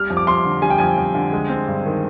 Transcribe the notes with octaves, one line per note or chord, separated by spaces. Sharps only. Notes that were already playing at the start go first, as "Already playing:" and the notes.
Already playing: G3 F6
F2
D6
F2 C6
D3
G3 G#5
G5
F2 G#5
F2
D3
G#3
C4
G2
D#3